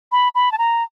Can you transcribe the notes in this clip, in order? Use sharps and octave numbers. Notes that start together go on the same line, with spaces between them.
B5
B5
A5
A#5